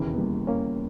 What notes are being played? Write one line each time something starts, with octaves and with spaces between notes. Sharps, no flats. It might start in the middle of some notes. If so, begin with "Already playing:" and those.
Already playing: E1 D#2 C#3 E3
B3
G3 A#3
A#3 C#4